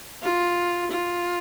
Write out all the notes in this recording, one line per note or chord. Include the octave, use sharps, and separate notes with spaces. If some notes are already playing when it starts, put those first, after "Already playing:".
F4
F4